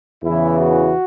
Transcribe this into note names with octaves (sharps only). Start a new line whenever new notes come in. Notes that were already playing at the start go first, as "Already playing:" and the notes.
E2 C#3 E3 E4
F#4